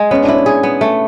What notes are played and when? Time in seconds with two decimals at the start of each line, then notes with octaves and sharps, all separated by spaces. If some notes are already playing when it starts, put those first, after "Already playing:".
Already playing: G#3 G#4
0.11 B3 C#4
0.23 D4
0.28 E4
0.34 C#4
0.46 G#4
0.63 B3
0.81 A3